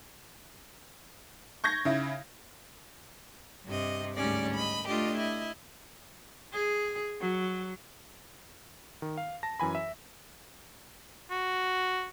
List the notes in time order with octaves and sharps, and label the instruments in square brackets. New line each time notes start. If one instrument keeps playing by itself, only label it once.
[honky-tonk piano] C#6 G6 G#6 A#6
C#3 E4
[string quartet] G2 C3 D#5
D2 G#2 G3 C#4 D5
D#5 B5
A3 D4 F4 G4 D#5
E4 D#5
[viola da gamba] G#4
F#3
[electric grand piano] D#3
F5
A5 A#6
F#2 E3 G#5 B5
E5
[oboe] F#4